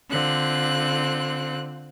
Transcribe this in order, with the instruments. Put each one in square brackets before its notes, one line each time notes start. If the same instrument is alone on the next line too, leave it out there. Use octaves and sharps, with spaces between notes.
[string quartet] D3 C4 F4 F#6